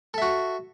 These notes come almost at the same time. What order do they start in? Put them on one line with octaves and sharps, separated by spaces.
A4 E5 F#4